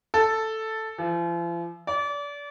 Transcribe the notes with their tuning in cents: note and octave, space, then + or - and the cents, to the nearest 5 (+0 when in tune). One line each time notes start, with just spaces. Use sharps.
A4 +0
F3 -40
D5 -30